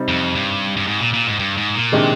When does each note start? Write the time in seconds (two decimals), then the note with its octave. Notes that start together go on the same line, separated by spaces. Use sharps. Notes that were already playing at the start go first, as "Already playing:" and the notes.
Already playing: C3 G3 C4 D#4
0.08 F2
0.35 G2
0.77 G2
0.87 G#2
1.00 A#2
1.14 A#2
1.27 G#2
1.39 G2
1.57 G#2
1.75 A#2
1.92 C3 D#3 G#3 D4 G4